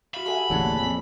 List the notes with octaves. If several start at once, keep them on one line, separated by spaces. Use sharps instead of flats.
F#4 E5 F5 B5
G4 A4 E5 F#5 G#5 C6
E1 A1 D3 A#3 F#4 G#4 A4 C#5
F2